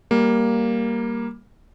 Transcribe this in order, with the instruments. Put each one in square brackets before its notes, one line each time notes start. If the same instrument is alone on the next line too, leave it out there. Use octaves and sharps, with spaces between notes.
[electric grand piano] G3 A#3